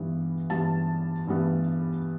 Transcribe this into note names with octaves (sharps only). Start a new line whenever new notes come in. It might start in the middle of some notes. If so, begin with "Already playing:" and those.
Already playing: G2 E3 G3 B3
G2 E3 G3 B3 A5
G2 E3 G3 B3